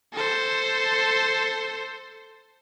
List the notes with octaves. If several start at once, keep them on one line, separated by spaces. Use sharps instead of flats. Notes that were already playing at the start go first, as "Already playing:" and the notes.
A4 C5